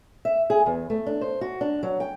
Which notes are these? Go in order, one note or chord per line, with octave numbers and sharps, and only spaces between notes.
E5
G#4
E2
A3
D4
C5
F#4
D4
F#3
G5